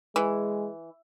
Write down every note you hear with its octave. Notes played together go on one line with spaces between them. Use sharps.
E3 G#3